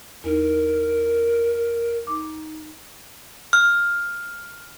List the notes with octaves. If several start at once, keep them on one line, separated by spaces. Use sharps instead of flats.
E2 D#4 A#4
D#4 D6
F6